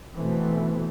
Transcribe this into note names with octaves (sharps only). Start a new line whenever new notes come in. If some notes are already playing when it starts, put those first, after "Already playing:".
B2 E3 A3 C4